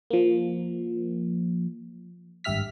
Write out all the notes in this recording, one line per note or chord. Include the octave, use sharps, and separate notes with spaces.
F3 A#3
G#1 G2 G4 E5 F6 B6